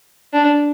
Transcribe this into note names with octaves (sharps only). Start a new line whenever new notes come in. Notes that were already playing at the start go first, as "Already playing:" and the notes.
D4